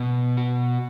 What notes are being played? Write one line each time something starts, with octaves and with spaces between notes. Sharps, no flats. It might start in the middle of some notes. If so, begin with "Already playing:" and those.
Already playing: B2
F#4